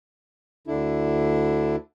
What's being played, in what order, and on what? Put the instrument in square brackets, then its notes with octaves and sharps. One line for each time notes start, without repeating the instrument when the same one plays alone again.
[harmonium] D2 D3 D4 E4